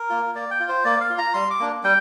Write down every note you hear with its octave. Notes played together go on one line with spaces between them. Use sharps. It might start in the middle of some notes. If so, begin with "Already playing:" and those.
Already playing: A#4
A#3 F4
A#3 D5
G5
F4
C5
A#3 D5
F5
F4
A#5
G3 C6
D6
A#3 D4
G3 G5